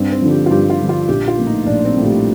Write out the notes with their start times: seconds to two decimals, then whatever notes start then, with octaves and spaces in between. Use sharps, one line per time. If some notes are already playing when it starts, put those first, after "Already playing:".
Already playing: G2 C4
0.12 C4
0.22 D3 F3
0.31 G4
0.46 F4
0.51 G2 G4
0.70 F4
0.80 D3 F3
0.89 F4
1.08 A#1 G4
1.28 F4
1.38 A2 F3 A#3
1.47 D#4
1.66 A#1 D4
1.85 C4
1.96 A2 F3 A#3
2.05 G3